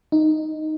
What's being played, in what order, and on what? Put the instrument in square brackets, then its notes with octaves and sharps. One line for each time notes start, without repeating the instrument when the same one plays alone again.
[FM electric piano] D#4